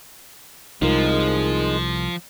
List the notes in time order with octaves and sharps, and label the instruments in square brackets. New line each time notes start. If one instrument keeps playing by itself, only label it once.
[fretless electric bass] C2 [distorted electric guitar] F3 [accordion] G#3 [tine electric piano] D#4 F4 A#4